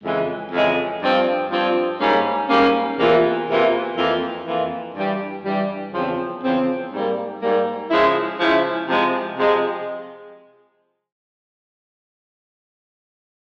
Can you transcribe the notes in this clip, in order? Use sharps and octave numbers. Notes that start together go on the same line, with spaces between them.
F2 C#3 E3 G#3
F2 C#3 E3 G#3
G2 F3 C4 F4
G2 F3 C4 F4
G#2 G3 A#3 C#4
G#2 G3 A#3 C#4
E2 C3 E3 A#3 F4
E2 C3 E3 A#3 F4
F2 E3 A#3 F4
F2 E3 A#3 F4
G2 E3 G3
G2 E3 G3
E2 C#3 F3 C4
E2 C#3 F3 C4
G#2 G3 A#3
G#2 G3 A#3
C#3 F3 G#3 E4
C#3 F3 G#3 E4
C3 F3 G#3
C3 F3 G#3